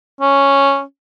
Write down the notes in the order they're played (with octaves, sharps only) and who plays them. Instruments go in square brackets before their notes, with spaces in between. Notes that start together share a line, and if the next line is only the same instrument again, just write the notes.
[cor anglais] C#4